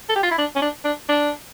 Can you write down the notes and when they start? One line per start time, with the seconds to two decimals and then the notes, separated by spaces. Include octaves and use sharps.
0.09 A4
0.16 G4
0.23 F4
0.31 E4
0.38 D4
0.56 C#4
0.62 D4
0.85 D4
1.09 D4